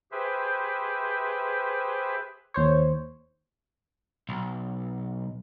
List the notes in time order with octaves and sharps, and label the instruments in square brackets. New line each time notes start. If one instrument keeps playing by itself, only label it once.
[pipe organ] G4 G#4 B4 C5 E5
[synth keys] D#2 C5 C#5
[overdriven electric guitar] B1